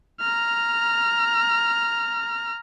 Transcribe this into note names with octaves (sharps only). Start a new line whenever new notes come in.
A#5 F6